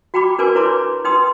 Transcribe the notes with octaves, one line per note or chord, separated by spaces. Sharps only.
F#4 G5 A#5 B5 D6
D4 A#4 B4 G#5 D6
E4 B4 C#5 A#5 C6 D6
D#4 B4 G5 C6 D#6